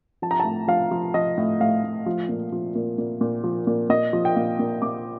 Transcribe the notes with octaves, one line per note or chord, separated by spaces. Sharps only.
F3 A5
A#5
A5
A2
F3 F5
F3
F3 D#5
A2
A2 F5
A2
F3
A#2
F3
A#2
A#2
A#2
F3
A#2
A#2 D#5
F3
G5
A#2 F5
A#2
A#2 D6